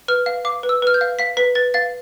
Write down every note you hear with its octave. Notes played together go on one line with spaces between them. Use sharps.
B4 F6
F5
F5 D6
B4
E6
B4 F6
G6
F5
F5 B6
B4 B6
B4 A6
F5 A6